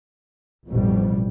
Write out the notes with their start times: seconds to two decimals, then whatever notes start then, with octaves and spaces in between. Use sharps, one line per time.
0.68 A1 F2 B2 G3